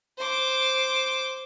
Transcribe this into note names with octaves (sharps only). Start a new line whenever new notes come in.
C5 D6